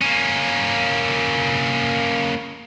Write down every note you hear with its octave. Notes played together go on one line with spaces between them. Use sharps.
A#3 C#4